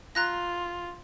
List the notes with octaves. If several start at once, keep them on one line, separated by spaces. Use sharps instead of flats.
F4 A#5 F#6 A#6